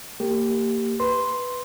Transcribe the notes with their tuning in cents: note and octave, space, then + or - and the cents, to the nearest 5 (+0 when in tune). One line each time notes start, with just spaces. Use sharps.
A#3 -25 G4 +0
B4 +0 C6 +0